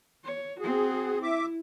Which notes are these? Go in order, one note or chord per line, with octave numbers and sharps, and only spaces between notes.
C#5
C4 F#4 G#4
E4 E5 D6